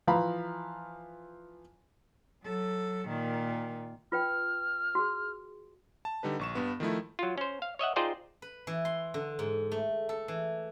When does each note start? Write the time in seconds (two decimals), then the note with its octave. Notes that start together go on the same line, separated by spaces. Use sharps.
0.07 E3 F3 F5 A#5 B5
2.43 F#3 A4
3.09 A#2 D#3
4.12 F4 B4 G5 F6
4.95 F#4 G#4
6.05 A5
6.23 D3 G3 D#4 B4
6.39 A#1 C#6 E7
6.55 G2 B3
6.80 D#3 F3 A3 E4
7.19 F#3 F4
7.38 C#4 C5
7.62 F5
7.79 C#5 D#5 E5 F#5
7.96 D#4 F4 G#4 C5 D5 G5
8.42 B4
8.67 E3
8.85 C6
9.14 D3
9.39 G#2
9.72 A3
10.09 A4
10.28 E3